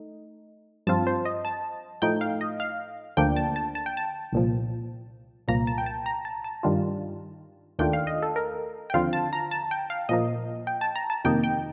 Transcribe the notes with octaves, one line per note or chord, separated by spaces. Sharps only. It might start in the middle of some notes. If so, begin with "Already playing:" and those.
Already playing: A3 D#4
G2 F3 C4 F4 A5
C5
D#5
A5
A2 F3 A3 D#4 G5
F5
D#5
F5
D2 D3 F3 A#3 D4 G5
A5
A5
A5
G5
A5
C2 A#2 F3
C2 A#2 F3 A#3 A#5
A5
G5
A5
A#5
A5
A5
G2 D#3 G3 D4 F4
D#2 D#3 A3 D4 F4 G5
F5
D#5
A4
A#4
G5
D#2 D3 F3 C4 F4 F5
A5
A#5
A5
G5
F5
A#2 F3 A#3 D#5
G5
A5
A#5
A5
F2 C3 D#3 A#3 D#4 G5
G5